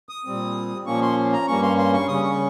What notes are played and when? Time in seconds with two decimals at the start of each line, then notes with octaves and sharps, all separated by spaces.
0.09 D#6
0.25 A#2 G3 C4
0.86 A#2 F3 A#3 C#4 C#6
1.02 C6
1.32 A#5
1.47 G2 G3 A#3 C#4 C#6
1.62 C6
1.78 C6
1.93 C#6
2.08 C#3 G3 C#4 D#6
2.23 C#6